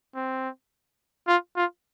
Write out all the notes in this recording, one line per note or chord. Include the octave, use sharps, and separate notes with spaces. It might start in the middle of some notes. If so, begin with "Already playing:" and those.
C4
F4
F4